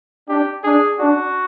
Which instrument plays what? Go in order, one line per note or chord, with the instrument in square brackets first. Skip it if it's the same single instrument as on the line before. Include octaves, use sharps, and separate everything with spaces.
[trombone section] D4 [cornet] G4
[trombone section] D4 [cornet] G#4
[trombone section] D4 [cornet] F#4